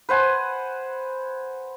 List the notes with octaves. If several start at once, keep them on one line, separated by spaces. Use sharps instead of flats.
B4 C5 F#5 G#5